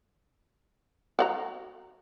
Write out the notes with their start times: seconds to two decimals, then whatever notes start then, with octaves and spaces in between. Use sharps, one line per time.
1.19 F#4 F#5 A#5